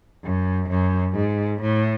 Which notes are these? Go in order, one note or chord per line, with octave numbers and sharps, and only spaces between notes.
F#2
F#2
G#2
A2